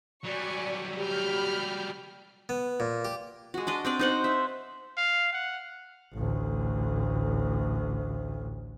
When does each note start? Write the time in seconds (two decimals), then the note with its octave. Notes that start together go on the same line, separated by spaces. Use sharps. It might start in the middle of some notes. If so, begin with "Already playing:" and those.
0.24 F#3 G3 D5 G#5 C#6
0.98 G4 B5 F6 G6
2.49 B3
2.80 A#2
3.05 G4
3.54 G#3 F#4
3.67 D4 D5 D#5
3.85 C4 D4 D5
3.99 D#4 C5 F#5
4.24 E5
4.97 F5
5.33 F#5
6.14 A1 D2